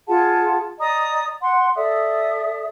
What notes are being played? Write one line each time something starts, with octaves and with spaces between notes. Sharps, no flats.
F4 G#4 F#5 A5
D5 D#5 A#5 D#6
F#5 C6
A4 D5 E5 D#6